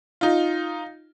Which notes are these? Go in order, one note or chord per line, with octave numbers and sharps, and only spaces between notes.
D#4 F4